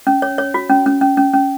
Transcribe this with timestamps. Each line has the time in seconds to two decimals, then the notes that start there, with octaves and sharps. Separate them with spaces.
0.07 C#4
0.22 C#5
0.38 C#5
0.54 F#4
0.70 C#4
0.86 C#4
1.01 C#4
1.17 C#4
1.33 C#4